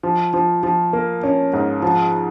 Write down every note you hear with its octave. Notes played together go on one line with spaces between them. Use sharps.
F3
F3
F3
A#3
C#4
G#2
F3